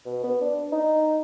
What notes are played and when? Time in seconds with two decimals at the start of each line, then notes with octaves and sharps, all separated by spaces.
0.06 B2
0.24 B3
0.41 D4
0.73 D#4